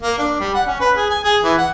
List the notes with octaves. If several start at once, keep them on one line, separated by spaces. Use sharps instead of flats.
A#3
D4
G3
F#5
C#4
B4
G#4
G#5
G#4
E3
F#5